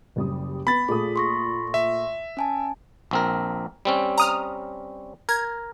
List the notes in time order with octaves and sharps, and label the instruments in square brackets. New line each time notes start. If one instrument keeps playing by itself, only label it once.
[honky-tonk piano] F#1 G3 D#6
[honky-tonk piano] B3 [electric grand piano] B5 A6
[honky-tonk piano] A#2 A3 D#6 [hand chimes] G#4
[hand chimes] C6 C#6 A#6
[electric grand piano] E5
[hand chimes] C#4 G#5 A5
[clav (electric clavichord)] A#1 C4 A#4
G3 C4 C#4
[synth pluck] A#5 D#6 F6
[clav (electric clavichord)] A#4 [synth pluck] G#6